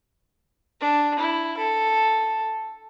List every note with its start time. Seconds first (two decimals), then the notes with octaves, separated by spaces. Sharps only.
0.81 D4
1.19 E4
1.57 A4